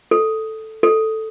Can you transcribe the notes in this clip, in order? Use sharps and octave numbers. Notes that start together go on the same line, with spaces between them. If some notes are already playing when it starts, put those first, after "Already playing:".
A4
A4